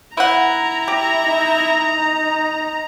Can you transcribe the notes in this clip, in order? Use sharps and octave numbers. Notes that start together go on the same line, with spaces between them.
E4 B4 F#5 A#5
G4
D#4